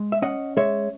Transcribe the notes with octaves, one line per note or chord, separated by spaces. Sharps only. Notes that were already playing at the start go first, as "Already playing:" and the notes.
Already playing: G#3
E5
C#4 D#5 F#5
G#3 C#5 E5